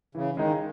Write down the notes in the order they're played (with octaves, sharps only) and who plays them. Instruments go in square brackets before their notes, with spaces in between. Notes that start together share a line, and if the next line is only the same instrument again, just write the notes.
[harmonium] C#3 [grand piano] E3
[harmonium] D#3 [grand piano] G#3 D#4